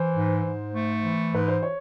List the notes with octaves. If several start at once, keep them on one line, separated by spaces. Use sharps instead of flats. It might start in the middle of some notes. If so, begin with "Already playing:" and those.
Already playing: E3 C5
G#2
G#2
A3
E3
G#2 B4
C5
C#5